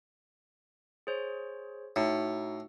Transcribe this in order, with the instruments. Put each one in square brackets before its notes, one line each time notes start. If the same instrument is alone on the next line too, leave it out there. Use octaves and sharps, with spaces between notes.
[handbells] G#4 C5 C#5
[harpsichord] A2 [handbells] D#4 F#4 C#7